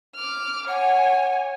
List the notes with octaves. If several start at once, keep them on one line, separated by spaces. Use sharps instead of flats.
D6 F6
C#5 F#5 G#5